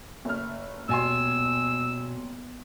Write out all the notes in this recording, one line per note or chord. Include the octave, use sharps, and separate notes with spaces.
F#1 A3 F6
D#1 B2 G#5 C6 E6